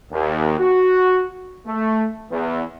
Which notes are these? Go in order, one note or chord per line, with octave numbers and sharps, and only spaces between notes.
D#2
F#4
A3
E2